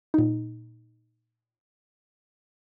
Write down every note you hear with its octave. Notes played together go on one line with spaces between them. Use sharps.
A#2 D#4